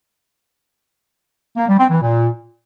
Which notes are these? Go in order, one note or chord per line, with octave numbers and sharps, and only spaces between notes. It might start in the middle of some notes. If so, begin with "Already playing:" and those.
A#3
G3
C4
E3
A#2